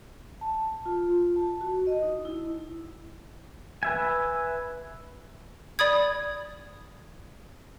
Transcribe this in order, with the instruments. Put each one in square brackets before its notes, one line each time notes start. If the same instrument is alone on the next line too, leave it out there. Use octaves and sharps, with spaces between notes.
[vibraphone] A5
F4
A5
F#4
D#5
D#4
E4
[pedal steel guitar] B4 E5 G#5
[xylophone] D5 B5 D#6 G#6